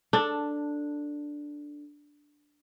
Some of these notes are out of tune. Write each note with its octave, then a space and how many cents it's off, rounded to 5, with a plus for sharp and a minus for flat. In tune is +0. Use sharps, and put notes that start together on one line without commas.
D4 +0 A4 +10